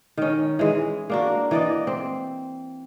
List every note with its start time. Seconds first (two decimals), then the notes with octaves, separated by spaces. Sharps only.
0.17 D#3 C#4
0.59 E3 G#3
1.10 A#3 D4 F#4
1.51 E3 D5 D#5
1.87 C4